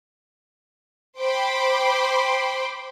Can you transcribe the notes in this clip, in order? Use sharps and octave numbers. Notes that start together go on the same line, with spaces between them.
C5 G5 B5 C6 D6